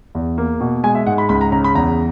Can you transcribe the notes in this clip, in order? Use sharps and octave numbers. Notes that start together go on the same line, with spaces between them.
E2
A#3
B2
G#3 G#5
E5
G#2 F#5
B5
C#2 B5
A#5
C#3 A#5
B5
E2 A#5